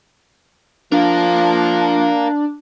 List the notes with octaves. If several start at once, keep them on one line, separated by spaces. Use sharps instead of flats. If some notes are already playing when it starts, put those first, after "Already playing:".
F3 D4 A#4 F5